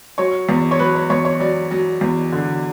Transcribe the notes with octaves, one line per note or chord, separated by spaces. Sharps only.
F#3 C#5
E2
C#5
F#3 B4
C#5
E2 C#5
C#5
F#3 D5
F#3
E2
D3